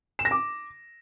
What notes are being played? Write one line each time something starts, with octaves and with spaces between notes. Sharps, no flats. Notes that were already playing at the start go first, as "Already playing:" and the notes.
E7
A#6
D6